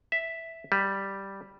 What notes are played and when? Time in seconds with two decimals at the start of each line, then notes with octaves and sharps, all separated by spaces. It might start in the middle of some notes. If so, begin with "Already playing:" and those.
0.12 E5
0.72 G3